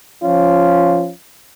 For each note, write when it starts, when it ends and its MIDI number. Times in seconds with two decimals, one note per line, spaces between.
0.24 1.11 53
0.24 1.11 61
0.24 1.11 65